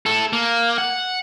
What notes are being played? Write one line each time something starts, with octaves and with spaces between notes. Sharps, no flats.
E4 A4
A#3
F#5